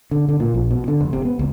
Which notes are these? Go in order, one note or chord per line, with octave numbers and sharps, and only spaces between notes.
D3
D3
A#2
A#1
B2
D3
F1
C3
B3
C#2